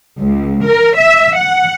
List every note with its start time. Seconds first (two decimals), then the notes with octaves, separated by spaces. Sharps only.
0.19 C#2
0.64 A#4
0.96 E5
1.38 F#5